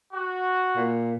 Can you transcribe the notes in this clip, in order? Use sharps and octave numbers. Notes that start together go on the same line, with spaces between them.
F#4
A#2